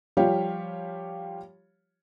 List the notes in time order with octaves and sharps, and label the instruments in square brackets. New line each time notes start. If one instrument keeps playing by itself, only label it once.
[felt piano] F3 G3 F4 G4 C#5 F5